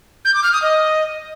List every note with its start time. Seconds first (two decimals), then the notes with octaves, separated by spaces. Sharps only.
0.25 G6
0.34 D6
0.44 F6
0.53 D#6
0.62 D#5